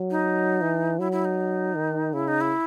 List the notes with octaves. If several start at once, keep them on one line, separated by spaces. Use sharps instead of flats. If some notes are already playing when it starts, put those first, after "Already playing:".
Already playing: F#3
D#4
E3
F#3 E4
E4
D#4
D#3
C#3 E4
D#4
E4